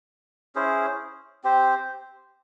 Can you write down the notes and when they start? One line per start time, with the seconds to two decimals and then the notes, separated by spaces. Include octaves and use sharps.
0.55 C#4 E4 G#4 C5
1.44 C4 G4 C5